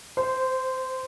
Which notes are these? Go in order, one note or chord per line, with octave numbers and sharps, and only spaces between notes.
C5